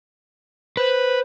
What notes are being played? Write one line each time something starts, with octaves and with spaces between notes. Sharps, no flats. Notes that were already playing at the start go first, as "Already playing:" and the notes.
B4 C5